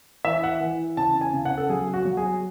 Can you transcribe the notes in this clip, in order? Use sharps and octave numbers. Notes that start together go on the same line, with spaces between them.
E3 E5
F#5
E3
C#3 A5
G#5
C#3
F#5
A4
F#3 G#4
F#4
F#3
G#4